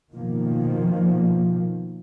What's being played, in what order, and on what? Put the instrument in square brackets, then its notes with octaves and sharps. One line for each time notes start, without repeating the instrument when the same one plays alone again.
[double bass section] B2 D#3 F3 A#3